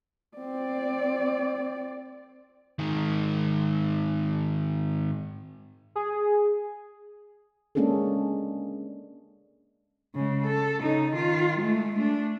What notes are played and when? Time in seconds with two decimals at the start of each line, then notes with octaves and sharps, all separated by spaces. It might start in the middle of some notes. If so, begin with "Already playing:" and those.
0.37 C4 D5
2.79 G#2 D#3
5.95 G#4
7.75 G#3 A#3 C#4 D4 G#4 A4
10.15 C#3 G#3
10.46 A4
10.82 C#3 D#4
11.15 D#3 F4
11.58 G#3 A3
11.95 A3 D4